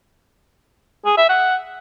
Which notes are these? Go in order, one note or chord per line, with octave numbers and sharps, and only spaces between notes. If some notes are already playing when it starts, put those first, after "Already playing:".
G#4
E5
F#5